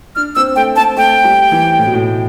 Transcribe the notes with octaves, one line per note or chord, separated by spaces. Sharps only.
D4 F6
C4 E6
A3 G5
C4 A5
A3 G5
G3
E3
A2
B2
A2